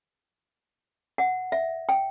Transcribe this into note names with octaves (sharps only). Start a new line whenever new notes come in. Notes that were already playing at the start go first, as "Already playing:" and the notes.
F#5
E5
G5